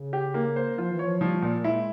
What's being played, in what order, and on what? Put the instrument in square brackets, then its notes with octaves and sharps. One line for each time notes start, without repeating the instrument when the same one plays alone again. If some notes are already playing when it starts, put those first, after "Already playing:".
Already playing: [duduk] C#3
[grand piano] G4
A#3
C5
[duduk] F3 [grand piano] F4
[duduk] E3
[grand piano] C#5
[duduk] F3
[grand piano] F3 [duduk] G3
[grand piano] A#2 [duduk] A#3
[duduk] G#3 [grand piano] E4